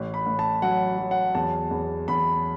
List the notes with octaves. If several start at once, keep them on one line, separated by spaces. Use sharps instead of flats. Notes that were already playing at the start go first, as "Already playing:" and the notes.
Already playing: A1
B5
A1
A5
F#3 F#5
F#3
F#5
E2 A5
E2
E2 B5